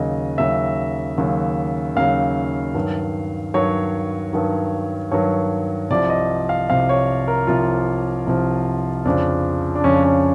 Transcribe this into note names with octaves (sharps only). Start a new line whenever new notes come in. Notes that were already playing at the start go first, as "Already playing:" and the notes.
Already playing: D#2 C#3 F#3 D#5
D#2 C#3 F#3 E5
D#2 C#3 F#3
D#2 C#3 F#3 F5
G2 D#3 F#3
G2 D#3 F#3 C#5
G2 D#3 F#3
G2 D#3 F#3 C#5
C2 C3 F3 D5
D#5
F5
C2 C3 F3 F5
C#5
A#4
C2 C3 F3 F4
C2 C3 F3
F2 C#3 F3 D4
D4
F2 C#3 F3 C#4
C#4